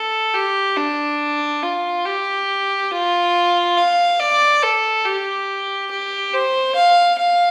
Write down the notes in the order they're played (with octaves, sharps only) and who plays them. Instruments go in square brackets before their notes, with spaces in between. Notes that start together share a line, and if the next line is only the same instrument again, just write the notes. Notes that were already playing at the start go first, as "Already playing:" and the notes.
Already playing: [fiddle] A4
G4
D4
F4
G4
F4
F5
D5
A4
G4
G4
C5
F5
F5